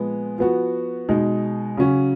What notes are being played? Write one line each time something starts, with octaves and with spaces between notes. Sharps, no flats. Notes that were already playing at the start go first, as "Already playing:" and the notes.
Already playing: A#2 F3 G#3 B3
F3 B3 F#4
B2 G#3 D#4
C#3 F#3 C#4 F#4